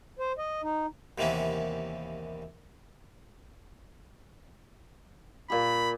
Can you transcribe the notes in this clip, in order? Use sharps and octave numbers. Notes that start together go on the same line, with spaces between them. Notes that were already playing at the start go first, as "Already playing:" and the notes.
C5
D#5
D#4
D#2 C3 E3 A#3 B3 C#4
A#2 G4 B5